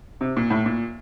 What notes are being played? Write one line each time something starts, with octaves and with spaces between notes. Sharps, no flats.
C3
A#2
A2
A#2